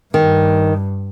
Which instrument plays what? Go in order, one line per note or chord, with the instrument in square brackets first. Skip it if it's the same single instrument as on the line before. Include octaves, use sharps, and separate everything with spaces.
[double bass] G2 [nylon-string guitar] D#3